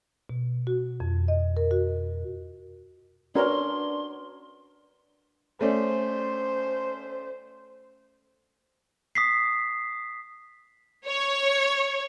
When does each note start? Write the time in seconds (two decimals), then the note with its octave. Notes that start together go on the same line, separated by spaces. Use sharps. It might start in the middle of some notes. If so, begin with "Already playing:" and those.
0.30 B2
0.67 F#4
1.00 F2
1.28 D#5
1.57 A#4
1.71 F#4
3.35 C#4 D4 F#4 A#4 B4 D5 C6
5.61 A3 C#4 C5 D5
9.15 D#6 B6 C7
11.05 C#5